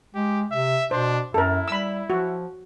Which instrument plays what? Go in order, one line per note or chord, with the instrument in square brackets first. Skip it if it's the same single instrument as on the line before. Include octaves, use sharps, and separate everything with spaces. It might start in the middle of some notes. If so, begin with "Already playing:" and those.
[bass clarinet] G#3 [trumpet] G4
[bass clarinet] C3 [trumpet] E5
[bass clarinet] B2 [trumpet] D4 [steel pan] C5
[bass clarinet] F#2 [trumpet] E4 [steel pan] A4 A#4
[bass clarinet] G3 [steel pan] B5 E6
[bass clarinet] F3 [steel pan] F#4